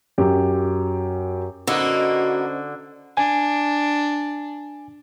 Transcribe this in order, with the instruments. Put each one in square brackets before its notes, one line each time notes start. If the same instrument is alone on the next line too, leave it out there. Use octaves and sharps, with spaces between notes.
[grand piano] F#2 G4
[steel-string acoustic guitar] D3 [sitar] A#3 B3 D#4 [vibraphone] C#4 C5 D#5 [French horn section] F#4
[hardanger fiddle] D4 [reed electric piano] G#5